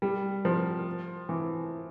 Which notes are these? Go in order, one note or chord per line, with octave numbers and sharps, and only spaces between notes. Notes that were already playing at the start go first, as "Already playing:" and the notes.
G3
F3
E3